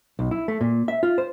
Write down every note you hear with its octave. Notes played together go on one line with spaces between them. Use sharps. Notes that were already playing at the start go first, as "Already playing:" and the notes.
B1
E4
A3
A#2
E5
F4
C5